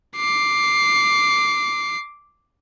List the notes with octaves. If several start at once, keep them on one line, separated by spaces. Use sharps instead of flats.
D6 C7